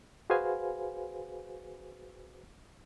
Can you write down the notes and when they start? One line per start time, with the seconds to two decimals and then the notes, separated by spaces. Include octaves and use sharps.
0.30 F#4 G#4 B4 C5 F5 G#5